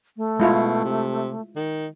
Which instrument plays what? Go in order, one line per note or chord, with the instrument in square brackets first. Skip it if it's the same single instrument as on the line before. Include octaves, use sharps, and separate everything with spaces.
[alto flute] A3
[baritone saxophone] B2 [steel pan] G#3 E4 F4
[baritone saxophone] C3
D#3